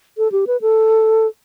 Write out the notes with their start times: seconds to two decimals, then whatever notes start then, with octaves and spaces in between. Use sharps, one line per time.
0.18 A4
0.32 G4
0.47 B4
0.61 A4